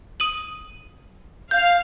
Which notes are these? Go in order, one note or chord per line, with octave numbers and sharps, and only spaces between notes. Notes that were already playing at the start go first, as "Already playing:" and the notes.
D#6 D#7 F#7
F5 G6